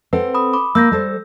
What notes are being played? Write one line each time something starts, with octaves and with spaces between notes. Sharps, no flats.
C4 A4 B4 F#5
B5 D#6
B5 D6
A#3 E6 G6 A#6
G3 A4 C5